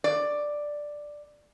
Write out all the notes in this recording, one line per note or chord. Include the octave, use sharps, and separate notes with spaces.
D5